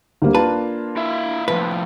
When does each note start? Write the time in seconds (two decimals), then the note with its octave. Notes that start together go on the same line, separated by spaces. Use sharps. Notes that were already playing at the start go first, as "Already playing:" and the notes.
0.22 D2 G3 A#3 F5
0.35 A#3 D4 F4 B4 A5
0.97 E4 E5 F5
1.48 A2 E3 F3 B4